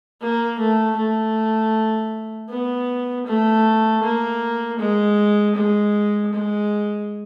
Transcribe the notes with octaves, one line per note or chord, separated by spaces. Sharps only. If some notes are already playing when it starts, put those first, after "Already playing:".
A#3
A3
A3
B3
A3
A#3
G#3
G#3
G#3